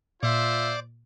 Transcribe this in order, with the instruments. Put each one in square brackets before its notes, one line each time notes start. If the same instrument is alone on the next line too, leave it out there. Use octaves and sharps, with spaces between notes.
[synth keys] A#2 [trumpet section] F4 E5 [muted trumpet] C5 [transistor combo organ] D5